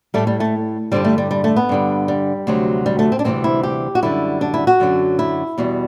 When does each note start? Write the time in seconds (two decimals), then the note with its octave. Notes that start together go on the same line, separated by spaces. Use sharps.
0.14 A2 G3 A3
0.27 G3
0.40 A3
0.92 G2 D3 G3 C4
1.05 A3
1.18 G3
1.31 G3
1.44 A3
1.56 B3
1.69 G2 D3 G3
2.08 G3
2.47 D2 C3 F#3
2.86 G3
2.99 A3
3.12 C4
3.19 D4
3.24 D2 C3 E3 G3 C4
3.44 E4
3.63 G4
3.95 F#4
4.02 F#2 D3 G3 E4
4.41 D4
4.54 E4
4.67 F#4
4.80 F#2 D3 F#3
5.19 E4
5.58 E2 B2 G3